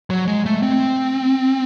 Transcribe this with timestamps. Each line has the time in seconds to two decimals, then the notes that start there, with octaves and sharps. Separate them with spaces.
0.10 F#3
0.28 G#3
0.46 A3
0.63 C4